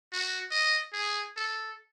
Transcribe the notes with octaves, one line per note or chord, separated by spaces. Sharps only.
F#4
D#5
G#4
A4